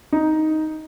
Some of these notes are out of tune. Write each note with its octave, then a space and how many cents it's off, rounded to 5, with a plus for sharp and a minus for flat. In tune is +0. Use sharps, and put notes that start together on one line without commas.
D#4 +5